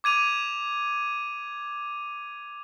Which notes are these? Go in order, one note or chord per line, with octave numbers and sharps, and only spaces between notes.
D6 G#6 D#7 F7